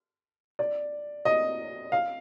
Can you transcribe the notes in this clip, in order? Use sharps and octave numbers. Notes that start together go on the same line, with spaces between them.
D5
D#5
F5